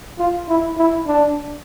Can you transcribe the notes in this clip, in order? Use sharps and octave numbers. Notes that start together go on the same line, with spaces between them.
F4
E4
E4
D4